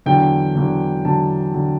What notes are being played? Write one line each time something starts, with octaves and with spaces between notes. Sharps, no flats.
E2 D3 F#3 G5
E2 D3 F#3
E2 D3 F#3 A5
D3 F#3